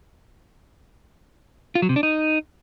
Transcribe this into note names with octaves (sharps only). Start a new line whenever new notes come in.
F4
F#3
C3
D4
D#4